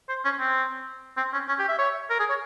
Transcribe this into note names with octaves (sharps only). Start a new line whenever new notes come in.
C5
C#4
C4
C4
C#4
C#4
G4
E5
C#5
A#4
G#4
C#5